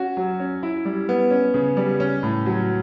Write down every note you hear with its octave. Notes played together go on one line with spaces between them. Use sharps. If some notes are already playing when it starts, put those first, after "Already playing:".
Already playing: C#4 F#4
F#3
C#4
E4
G3
B3
C#4
C#3
G3
C#4
A2
F#3